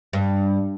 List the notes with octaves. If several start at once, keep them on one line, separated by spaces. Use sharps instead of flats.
G2